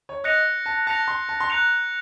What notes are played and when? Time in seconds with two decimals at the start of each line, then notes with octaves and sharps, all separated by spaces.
0.09 C#5
0.24 D#5 F#6 A#6 C#7 F7
0.66 A5
0.87 A5 F#6 A#6 C#7 F7
1.08 C6
1.29 A5
1.40 C6
1.50 A#5 F#6 A#6 C#7 F7